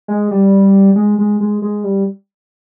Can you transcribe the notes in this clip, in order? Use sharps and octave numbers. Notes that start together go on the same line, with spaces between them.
G#3
G3
G#3
G#3
G#3
G#3
G3